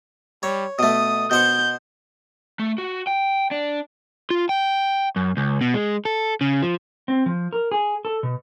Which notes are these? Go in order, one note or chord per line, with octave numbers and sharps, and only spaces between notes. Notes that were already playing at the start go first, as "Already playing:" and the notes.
G3 C#5
B2 A3 D#6
B2 C5 F#5 G6
A3
F#4
G5
D4
F4
G5
F#2
C#2
B2
G#3
A4
C#3
F3
C4
F3
A#4
G#4
A4
B2